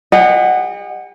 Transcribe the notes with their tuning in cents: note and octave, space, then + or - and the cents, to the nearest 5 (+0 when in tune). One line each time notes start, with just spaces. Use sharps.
G4 +45 D#5 -25 F#5 +0